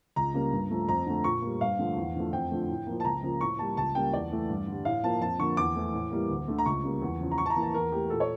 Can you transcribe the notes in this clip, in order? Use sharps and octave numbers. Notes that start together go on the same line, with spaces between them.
C#2 A#5
C#3 G3 A#3
G2
F3 A3
F2 A#5
D3 A3
A#2 C#6
G3 A#3
G2 F5
D3 F3 A3
E2
D3 F3 A3
F2 G5
D3 F3 A3
A2
F3 A#3
A5
C#2 A#5
C#3 F3 A#3
A2 C#6
G3 A#3 A5
C#2 A5
C#3 G3 A#3 G5
E2 D5
E3 A3
G2
D3 G3
A2 F5
F3 A#3 A5
F2 A5
D3 F3 A#3 C#6
E2 D6
E3 A3
A2
E3 G3 A#3
D2
D3 A3
A#5
C#2 C#6
C#3 G3 A#3
E2
C#3 F3
A#5
A2 C#6
A5
A#5
E3 A#3
A5
E2 A#4
E3 A3 G4
A#2 A4
C#5